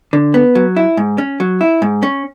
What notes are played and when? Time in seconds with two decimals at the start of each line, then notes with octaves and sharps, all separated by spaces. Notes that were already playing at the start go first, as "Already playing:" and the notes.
0.13 D3
0.34 B3
0.55 F#3
0.76 E4
0.97 G#2
1.18 C#4
1.40 F#3
1.61 E4
1.82 G#2
2.03 C#4